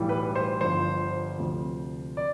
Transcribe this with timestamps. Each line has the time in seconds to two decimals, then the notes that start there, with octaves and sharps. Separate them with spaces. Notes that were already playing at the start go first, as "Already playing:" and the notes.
Already playing: B1 A2 E3 G3
0.09 B4
0.35 C5
0.61 G1 G2 F3 C5
1.38 D2 C3 F3
2.17 D5